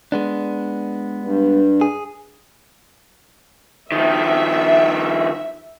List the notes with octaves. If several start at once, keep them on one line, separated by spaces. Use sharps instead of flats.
G#3 B3 D4
G2
G#4
D#3 F3 E5